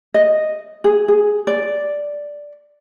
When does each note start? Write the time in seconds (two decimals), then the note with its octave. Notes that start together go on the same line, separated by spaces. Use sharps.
0.14 D#5
0.84 G#4
1.08 G#4
1.47 D5